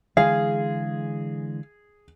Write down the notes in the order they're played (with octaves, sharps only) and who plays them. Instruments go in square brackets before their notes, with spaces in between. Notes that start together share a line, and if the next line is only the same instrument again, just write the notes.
[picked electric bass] D3 E3 G#3 [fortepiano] G#4 [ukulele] F5